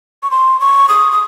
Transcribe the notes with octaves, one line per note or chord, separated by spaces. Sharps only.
C#6
C6
C#6
D#6
D#6